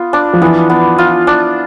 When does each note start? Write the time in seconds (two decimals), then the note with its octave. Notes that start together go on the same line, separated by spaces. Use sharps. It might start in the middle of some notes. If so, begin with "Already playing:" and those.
Already playing: B3 F4
0.13 D4
0.33 F3
0.42 E3 B3
0.70 B3
0.98 F4
1.27 D4